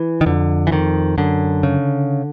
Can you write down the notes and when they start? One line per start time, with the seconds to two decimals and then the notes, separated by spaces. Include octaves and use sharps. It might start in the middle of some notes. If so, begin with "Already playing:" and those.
Already playing: E3
0.21 D#3
0.26 F2 D3
0.67 E3
0.71 F2 D#3
1.18 F#2 D3
1.63 C#3